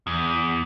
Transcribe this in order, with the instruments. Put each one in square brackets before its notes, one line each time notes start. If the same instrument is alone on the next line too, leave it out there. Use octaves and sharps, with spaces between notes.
[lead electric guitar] E2